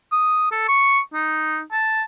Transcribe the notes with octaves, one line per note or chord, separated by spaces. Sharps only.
D#6
A4
C#6
D#4
A5